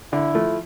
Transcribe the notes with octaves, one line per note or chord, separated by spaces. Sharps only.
D3 E4
F3 A3